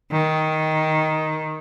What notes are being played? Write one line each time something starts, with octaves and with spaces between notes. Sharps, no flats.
D#3